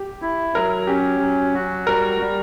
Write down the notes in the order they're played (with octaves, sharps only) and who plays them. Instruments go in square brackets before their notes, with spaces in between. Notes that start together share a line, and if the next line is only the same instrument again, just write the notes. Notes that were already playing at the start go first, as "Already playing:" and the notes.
Already playing: [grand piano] G4
[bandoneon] E4
[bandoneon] F#3 [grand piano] A#4
[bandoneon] C#4 [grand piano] G4
[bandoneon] F#3
F#4
[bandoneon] G3 [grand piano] A#4
[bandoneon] G3